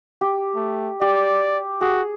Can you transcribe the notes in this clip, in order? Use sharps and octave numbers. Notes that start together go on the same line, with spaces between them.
G4
A3
G4 D5
F#4 G#4